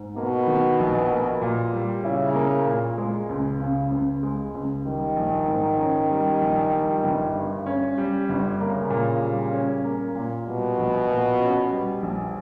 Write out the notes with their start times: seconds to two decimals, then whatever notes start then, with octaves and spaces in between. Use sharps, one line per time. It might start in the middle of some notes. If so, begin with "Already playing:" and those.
Already playing: G#2
0.16 B2 A#3
0.47 D#3
0.79 A#1
1.11 A#3
1.42 A#2
1.73 G3
2.03 C#3 E4
2.35 A#3
2.67 A#2
2.98 G#3
3.29 C#2
3.60 C#3
3.91 C#2
4.23 G#3
4.54 C#2
4.85 D#3 G3
5.16 A#1
5.48 G#2
5.78 C#4
6.10 G3
6.42 A#1
6.72 G3
7.03 G1
7.35 G2
7.66 C#4
7.98 G3
8.29 G1
8.60 C#3 A#3
8.90 A#2
9.22 G3
9.53 C#4
9.84 A#3
10.15 A#2
10.46 B2 G3
10.78 A#1
11.10 A#2
11.40 C#4
11.72 G3
12.02 A#1